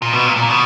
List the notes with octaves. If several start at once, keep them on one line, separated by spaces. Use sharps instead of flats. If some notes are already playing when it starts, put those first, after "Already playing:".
A#2
B2
A#2
A#2
B2